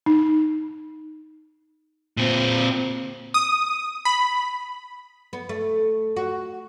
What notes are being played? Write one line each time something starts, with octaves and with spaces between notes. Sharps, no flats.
D#4
A#2 C4
D#6
B5
B3
A3
F#4